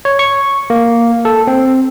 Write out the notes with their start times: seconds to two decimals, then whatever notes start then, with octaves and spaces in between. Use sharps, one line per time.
0.05 C#5
0.19 C#6
0.70 A#3
1.25 A4
1.47 C4